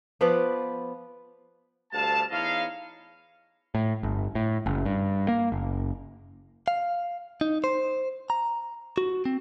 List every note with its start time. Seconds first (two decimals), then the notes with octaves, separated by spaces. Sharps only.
0.21 F3 B3 B4 D5
1.92 D2 G2 C3 F5 A5
2.31 E2 D#4 E4 C#5 D#5 F5
3.75 A2
4.03 G1
4.35 A2
4.66 F#1
4.85 G2
5.28 A#3
5.52 F#1
6.68 F5
7.41 D#4
7.64 C5
8.30 A#5
8.98 F#4
9.26 C4